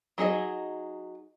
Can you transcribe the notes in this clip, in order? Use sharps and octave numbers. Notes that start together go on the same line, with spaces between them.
F#3 D#4 G#4 D#5